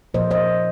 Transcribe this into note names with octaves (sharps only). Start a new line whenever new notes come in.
A#2 F3 A#3 C5 D#5
C5 D#5